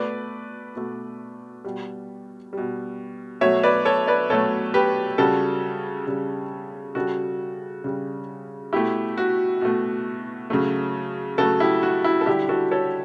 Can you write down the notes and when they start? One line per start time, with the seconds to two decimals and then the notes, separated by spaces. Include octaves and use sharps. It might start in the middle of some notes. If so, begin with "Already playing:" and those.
Already playing: B2 A3 B4 D5
0.76 B2 A3
1.64 B2 G3
2.53 B2 G3
3.41 B2 F#3 A3 C#5 E5
3.63 B4 D5
3.85 A4 C#5
4.08 B4 D5
4.30 B2 F#3 A3 A4 C#5
4.74 G4 B4
5.18 C#3 G3 F#4 A4
6.07 C#3 G3
6.95 C#3 G3 F#4 A4
7.84 C#3 G3
8.73 B2 A3 E4 G4
9.18 F#4
9.61 B2 A3
10.50 C#3 F#3 A3
11.38 C#3 F#3 A3 F#4 A4
11.60 E4 G4
11.83 F#4
12.04 E4
12.21 A4
12.26 D3 G3 E4 G4
12.49 F#4 A4
12.71 A4 C#5